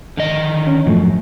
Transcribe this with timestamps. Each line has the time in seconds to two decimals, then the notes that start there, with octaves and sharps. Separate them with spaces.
0.17 D3 D#3 D#5
0.67 C#4
0.86 F#2 A2 F3 A3